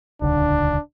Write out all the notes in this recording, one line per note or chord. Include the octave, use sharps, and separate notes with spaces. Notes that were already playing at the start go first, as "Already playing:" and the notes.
D#1 C#2 D3 D4